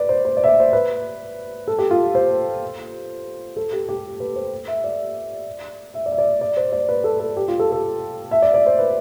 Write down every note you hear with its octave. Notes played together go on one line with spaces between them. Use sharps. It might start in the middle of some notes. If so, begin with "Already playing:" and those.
Already playing: B4 D5
C5
C5
D5
E5
D5
C5
B4
A4
G4
F4
C5
A4
G4
G4
B4
C5
E5
D5
E5
D5
E5
D5
D5
C5
D5
B4
A4
A4
G4
F4
A4
A4
E5
D5
D5
C5
B4